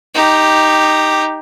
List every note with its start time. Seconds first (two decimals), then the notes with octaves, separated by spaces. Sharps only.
0.15 D#4 G4